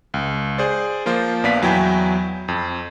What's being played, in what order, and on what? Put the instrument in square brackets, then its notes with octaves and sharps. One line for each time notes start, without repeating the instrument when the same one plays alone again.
[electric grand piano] C#2
G#4 C5 D5
F3 A#3 F4 C5
A#1 B3 D5 F5 B6
E2 F#3 E4 G5 G#5 B5
F2